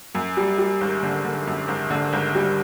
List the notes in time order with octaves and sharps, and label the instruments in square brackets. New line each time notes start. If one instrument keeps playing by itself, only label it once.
[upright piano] F#2
G3
G3
G#1
D3
D3
F#2
G#1
D3
G#1
G3